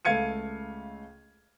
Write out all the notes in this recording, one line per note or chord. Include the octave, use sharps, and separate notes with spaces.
C#2 A3 F5 G#6 C#7 D#7